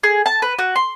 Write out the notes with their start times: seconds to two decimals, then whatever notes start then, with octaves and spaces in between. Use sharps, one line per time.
0.03 G#4
0.26 A5
0.42 B4
0.59 F#4
0.76 C6